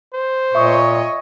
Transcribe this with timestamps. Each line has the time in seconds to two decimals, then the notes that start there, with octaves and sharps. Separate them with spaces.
0.14 C5
0.55 A#2 C#5 D#5 E5 C#6 D#6